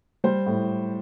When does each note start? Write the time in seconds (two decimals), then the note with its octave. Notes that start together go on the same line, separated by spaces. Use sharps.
0.24 G3 C5
0.46 A2